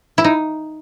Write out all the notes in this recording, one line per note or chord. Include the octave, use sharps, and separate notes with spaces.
E4
D#4